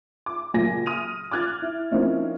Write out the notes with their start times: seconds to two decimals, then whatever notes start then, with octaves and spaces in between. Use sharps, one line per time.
0.26 D6
0.54 C#2 A#2 F#3 A#3 G#5 A#6
0.86 D#6 F6 D#7 F7
1.31 D6 F6 F#6 G#6 A6
1.62 E4
1.91 F3 A#3 C4 C#4 D#4 E4